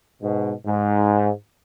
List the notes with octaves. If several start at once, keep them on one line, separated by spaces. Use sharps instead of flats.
G#2 B2
G#2